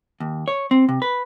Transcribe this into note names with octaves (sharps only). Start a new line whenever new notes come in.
D#2
C#5
C4
C3
B4